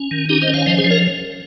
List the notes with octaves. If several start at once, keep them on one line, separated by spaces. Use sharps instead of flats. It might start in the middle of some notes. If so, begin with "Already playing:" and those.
Already playing: C#4
D#3
C#4 D#4 G4
C5 D#5
C#4
C#5 F5
F3 C5 D#5
G#4 C5
F3
A#4 C#5